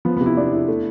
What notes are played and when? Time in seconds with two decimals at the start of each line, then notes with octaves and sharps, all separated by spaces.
0.05 F3 B3
0.17 C3 B3
0.26 E4
0.37 B3 D4
0.52 E4
0.68 A3